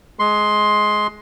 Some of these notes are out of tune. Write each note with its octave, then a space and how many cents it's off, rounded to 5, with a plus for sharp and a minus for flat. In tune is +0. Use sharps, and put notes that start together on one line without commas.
G#3 +15 C6 +5